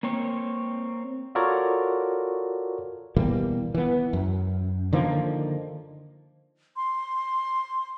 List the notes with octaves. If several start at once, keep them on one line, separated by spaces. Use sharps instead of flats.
A#3 C4 C#5
F4 F#4 A4 A#4 C#5 D5
B2 E3 G3 A#3
E3 B3
F#2
D3 D#3 F3 A#3
C6